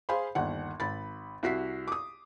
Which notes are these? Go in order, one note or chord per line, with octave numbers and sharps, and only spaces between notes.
G#4 C5 F5 B5 C6
G1 D#2 F#5
G#1 B5 A6
C2 F#4 B6 C7
D6 D#6